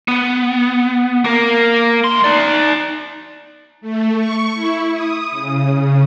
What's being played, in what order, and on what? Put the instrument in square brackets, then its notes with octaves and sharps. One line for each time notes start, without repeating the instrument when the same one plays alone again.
[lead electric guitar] B3
A#3 A#4
A3 C6
D#4 D5
[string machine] A3
C#6
E4
D#6
C#3